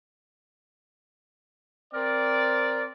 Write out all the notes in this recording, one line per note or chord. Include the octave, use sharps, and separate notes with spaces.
C4 A#4 D5